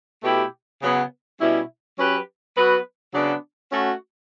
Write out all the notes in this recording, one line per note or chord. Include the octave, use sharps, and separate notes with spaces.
B2 A3 E4 G4
C#3 F#3 B3
B2 G3 C#4 E4
F#3 C#4 G4 B4
F#3 B3 F#4 B4
C#3 F#3 B3 D4
A3 C#4 F#4